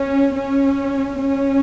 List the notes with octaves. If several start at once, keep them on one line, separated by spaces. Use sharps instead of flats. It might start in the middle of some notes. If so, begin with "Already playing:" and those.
Already playing: C#4
C#4
C#4